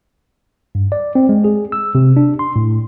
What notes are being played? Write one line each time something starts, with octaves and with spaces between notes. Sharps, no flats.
G2
D5
C4
G#3
G#4
E6
C3
D4
C6
A2